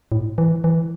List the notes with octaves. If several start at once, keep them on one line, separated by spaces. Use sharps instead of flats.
A2
E3
E3